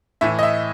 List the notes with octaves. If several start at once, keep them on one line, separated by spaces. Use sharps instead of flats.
A2 E3 E5
D#5
E5